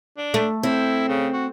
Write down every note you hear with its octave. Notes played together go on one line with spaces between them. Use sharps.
D4
A3
C4 E4
C#3
F#4